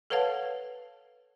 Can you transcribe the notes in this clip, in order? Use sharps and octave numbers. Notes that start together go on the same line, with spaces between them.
A4 B4 C#5 F5 F#5 A5